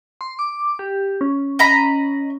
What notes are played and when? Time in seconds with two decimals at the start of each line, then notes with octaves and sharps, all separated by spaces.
0.21 C6
0.39 D6
0.79 G4
1.21 C#4
1.59 D#5 A#5 B5